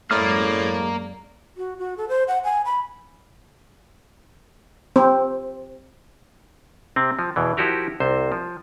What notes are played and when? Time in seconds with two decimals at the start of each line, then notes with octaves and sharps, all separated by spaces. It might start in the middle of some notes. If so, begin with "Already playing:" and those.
0.11 F#2 A2 G#3 A#3 D5 F6
1.57 F#4
1.79 F#4
1.97 A4
2.09 C5
2.28 F#5
2.44 G#5
2.65 B5
4.96 C4
6.96 C3 C4
7.19 F3
7.36 E2 B2 E3
7.57 F3 E4 F#4 G4 A#4
8.00 C2 C3 C5
8.32 F3